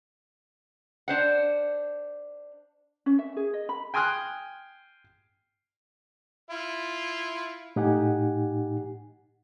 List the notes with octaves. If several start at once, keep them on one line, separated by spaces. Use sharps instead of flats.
D4 C5 F#5
C#4
E5
G#4
D#5
B5
G5 G#5 C6 D#6 F6 F#6
E4 F4
A2 D#4 G4 F#5 G#5